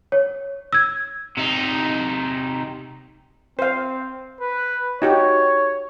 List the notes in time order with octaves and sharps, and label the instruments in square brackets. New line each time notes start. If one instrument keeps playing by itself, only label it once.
[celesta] C#5
E6 G#6
[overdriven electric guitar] C3 D#4
[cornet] C4 [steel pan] C5 F5
[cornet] B4
[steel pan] D#4 F#4 G4 [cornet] C#5